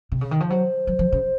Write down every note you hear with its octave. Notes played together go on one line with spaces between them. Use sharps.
C3
C#3
D#3
F3
F#3 C5
F#3
F3
C#3